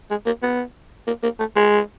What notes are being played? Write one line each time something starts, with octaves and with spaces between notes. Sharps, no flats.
G#3
A#3
B3
A#3
A#3
A3
G#3